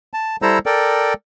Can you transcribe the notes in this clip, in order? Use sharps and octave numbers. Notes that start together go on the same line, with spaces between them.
A5
G3 E4 A4 C5 A#5 E6
A4 A#4 D5 G5